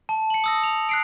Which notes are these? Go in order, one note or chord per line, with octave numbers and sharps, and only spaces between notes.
A5
C#7 F#7
D#6 E6 A#6
F7
F#6 C7 D7